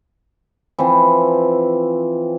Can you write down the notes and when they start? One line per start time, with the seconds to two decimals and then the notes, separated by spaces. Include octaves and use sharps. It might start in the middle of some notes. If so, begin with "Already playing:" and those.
0.79 E3 F3 C4 F4